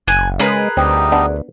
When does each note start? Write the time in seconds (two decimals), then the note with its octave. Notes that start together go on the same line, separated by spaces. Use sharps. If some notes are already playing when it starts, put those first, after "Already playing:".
0.08 F#1 G#5 F#6
0.39 C#3 G#3 G#4 A#4 B4
0.77 D2 G3 C4 D#4
1.12 B3 D4